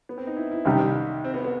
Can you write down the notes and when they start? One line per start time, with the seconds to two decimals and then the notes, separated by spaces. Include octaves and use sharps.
0.09 B3
0.18 C4
0.27 D#4
0.37 E4
0.51 E4
0.65 C2 C3 D#3 G3 D#4
1.25 C4
1.34 B3
1.44 B3